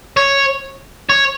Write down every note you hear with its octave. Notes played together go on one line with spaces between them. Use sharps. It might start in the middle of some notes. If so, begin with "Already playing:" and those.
C#5
C#5